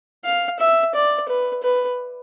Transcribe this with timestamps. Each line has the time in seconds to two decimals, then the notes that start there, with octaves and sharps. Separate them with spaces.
0.24 F5
0.60 E5
0.95 D5
1.29 B4
1.63 B4